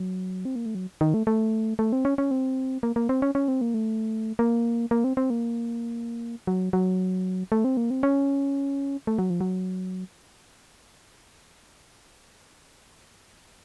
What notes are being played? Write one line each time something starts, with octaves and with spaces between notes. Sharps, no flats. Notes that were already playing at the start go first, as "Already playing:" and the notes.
Already playing: F#3
C4
A#3
A3
F#3
D#3
A3
A3
A3
C4
C#4
C#4
C4
A#3
A#3
C4
C#4
C#4
C4
A#3
A3
A#3
A#3
C4
C4
A#3
F#3
F#3
A3
C4
A#3
C4
C#4
A3
F#3
F3
F#3